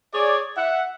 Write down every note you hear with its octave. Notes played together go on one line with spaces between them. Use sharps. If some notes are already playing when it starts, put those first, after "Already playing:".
G#4 C#5 D5
E5 F#5